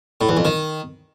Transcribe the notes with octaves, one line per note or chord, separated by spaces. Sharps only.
A2
E2
F2
D#3